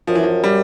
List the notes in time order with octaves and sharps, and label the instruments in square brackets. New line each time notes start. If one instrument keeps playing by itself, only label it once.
[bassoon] F#2 [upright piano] F3
[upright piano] E3
F3
G3